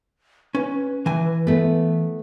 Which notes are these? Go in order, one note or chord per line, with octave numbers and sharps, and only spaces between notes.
C#4 B4
E3 G#5
A3 B3